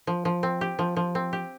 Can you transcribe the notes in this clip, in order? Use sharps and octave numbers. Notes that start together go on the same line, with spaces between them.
F3
F3
C4
G4
F3
F3
C4
G4